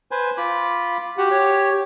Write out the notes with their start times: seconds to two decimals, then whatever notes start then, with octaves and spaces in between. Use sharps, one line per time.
0.11 B4 C5 G#5
0.37 F4 B5 D6
1.18 F#4 G4 F#5
1.31 C#5